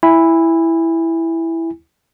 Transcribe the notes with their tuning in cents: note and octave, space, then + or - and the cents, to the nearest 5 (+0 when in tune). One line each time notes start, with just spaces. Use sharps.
E4 +0 G#5 -30